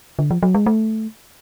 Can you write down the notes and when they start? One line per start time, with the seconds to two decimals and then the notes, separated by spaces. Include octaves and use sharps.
0.19 D3
0.31 F3
0.43 F#3
0.54 G#3
0.66 A3